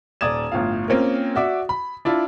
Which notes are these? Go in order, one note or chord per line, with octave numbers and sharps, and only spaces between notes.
D#1 D5 D#6 G#6 E7
G1 A2 F4 F5
A#3 C4 C#4 F4 A#4
F#4 D5 E5 D6
B5
D4 E4 F4